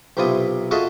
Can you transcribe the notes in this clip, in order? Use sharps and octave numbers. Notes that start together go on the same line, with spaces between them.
B1 C3 E4 F4 D#6
F4 F#4 G#4 A4 D#5 E5